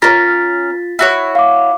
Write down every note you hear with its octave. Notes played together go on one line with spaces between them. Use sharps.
C#4 F4 A#4 A6 B6
E4 F#4 C#5
F5 D6